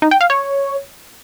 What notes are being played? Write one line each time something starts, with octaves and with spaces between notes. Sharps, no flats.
D#4
G5
F5
C#5